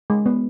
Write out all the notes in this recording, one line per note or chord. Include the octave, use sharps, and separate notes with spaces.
G#3
B3